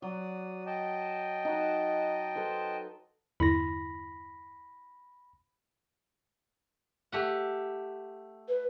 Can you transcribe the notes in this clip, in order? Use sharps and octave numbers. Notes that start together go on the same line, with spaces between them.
F#3 D5 D#6
D#5 G5 A5
D#4 F#4
A4 B4 C5
E2 G2 D3 E4 B5 A#6
A3 G4 F#5
B4